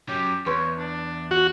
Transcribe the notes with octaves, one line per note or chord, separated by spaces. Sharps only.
F#3 C#4 G4
E2 D#4 B4 C#5 C6
D4
F#4